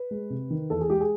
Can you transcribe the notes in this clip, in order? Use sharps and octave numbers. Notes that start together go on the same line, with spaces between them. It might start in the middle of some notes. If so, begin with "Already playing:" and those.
Already playing: B4
G#3
C3
D#3
E2 A4
G#4
G#3 G4
G#4